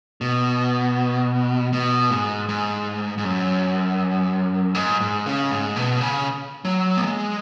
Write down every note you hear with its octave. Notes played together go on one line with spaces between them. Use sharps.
B2
B2
G#2
G#2
G#2
F#2
G#2
G#2
C#3
G#2
B2
C#3
F#3
B3
G#3